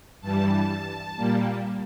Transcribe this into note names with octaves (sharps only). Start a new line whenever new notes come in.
G2 E3 G3 A5
A#2 G3 A#3